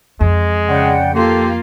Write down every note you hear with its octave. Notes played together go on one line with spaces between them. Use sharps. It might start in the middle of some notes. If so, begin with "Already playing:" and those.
F2 G#3
C#3 D5 F#5 G5
A#3 F4 G4 A4 C6